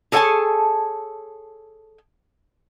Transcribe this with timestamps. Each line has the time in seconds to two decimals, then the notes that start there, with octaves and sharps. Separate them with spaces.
0.12 G#4 A4 C#5 F#5 G#5 A5